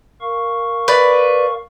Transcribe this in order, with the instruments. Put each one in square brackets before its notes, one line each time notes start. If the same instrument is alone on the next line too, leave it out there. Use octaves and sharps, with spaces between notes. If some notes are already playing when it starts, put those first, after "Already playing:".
[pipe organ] A#4 F5 C#6
[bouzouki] B4 D5